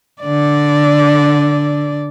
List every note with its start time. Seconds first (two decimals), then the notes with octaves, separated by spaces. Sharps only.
0.22 D3 D5